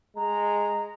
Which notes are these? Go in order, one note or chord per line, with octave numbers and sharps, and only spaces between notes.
G#3 A#5